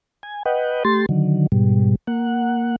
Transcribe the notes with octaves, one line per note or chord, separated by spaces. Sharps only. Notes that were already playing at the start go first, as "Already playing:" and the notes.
G#5
B4 D#5 F#5 G5
A3 G4 C6 A6
D3 D#3 F#3
G#2 B2 G3
A#3 F#5